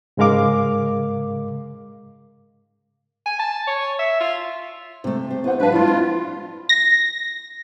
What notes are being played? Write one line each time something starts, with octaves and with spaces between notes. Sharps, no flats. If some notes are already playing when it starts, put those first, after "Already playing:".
G#2 C#3 G#3 A#4 F5 D6
G#5
A5
C#5
E5
F4
C3 A3 C4
C4 C5
B3 E4 G4 C5 F#5
G#2 F#3 D4 B4 F5 A5
F3 G#3 D4 E4 F4
C4 D#4
A#6